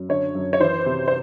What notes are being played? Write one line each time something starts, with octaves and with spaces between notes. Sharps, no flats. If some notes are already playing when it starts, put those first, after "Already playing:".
Already playing: F#2
D3 C#5
F#2
C#5
E3 C5
C3
C5